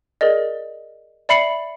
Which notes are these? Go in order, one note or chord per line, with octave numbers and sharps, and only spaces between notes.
G#4 A#4 D5 D#5
D5 E5 B5 C7 C#7 F#7